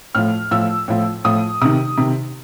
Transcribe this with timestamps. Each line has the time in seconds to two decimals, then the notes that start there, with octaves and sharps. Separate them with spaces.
0.15 A2 F3 F6
0.51 A2 F3 E6
0.88 A2 F3
1.24 A2 F3 D#6
1.61 C3 D#3 D#6
1.97 C3 D#3